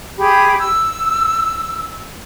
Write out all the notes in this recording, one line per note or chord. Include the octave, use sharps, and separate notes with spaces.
G4 G#4 B5
E6